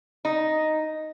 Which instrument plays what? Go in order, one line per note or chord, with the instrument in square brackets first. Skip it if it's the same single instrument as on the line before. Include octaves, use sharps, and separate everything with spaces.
[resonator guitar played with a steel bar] D#4